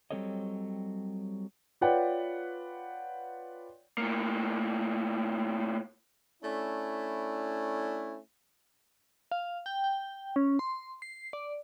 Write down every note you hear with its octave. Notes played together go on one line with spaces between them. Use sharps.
F#3 G3 C4 A4 C#5 D#5
F4 B4 C#5 D5 F#5 G5
A2 A#3
A3 C#4 D4 E4
F5
G5
G5
C#4
C6
C7
D5